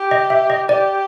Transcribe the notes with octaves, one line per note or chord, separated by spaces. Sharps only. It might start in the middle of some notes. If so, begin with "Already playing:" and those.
Already playing: G4
D#5
E5
D#5
G4 D5